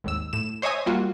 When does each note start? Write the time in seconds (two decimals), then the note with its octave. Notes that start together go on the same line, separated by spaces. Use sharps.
0.04 G#1 D#2 E6
0.33 A2 E7
0.62 C5 C#5 D#5 E5 G#5 D#6
0.86 G3 A#3 F4 F#4